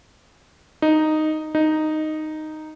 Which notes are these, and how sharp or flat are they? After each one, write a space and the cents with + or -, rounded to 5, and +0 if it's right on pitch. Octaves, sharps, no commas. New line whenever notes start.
D#4 -5
D#4 -5